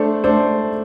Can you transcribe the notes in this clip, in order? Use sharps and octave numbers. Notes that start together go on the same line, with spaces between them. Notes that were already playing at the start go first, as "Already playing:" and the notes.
Already playing: A3 D4 A4 C5
A3 D4 A4 C5